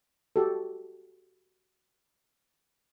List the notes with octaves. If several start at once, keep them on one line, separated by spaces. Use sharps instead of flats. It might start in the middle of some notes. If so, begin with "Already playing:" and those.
F#4 G4 A4